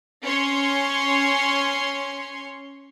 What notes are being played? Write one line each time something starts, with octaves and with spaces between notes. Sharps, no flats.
C#4 C#5 C6